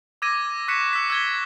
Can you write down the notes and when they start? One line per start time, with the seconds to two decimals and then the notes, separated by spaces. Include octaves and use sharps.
0.22 D6 E6 G#6 A#6 D#7
0.68 C#6 F#6 B6 C#7 E7
0.93 E6 B6
1.10 E6 G#6 G7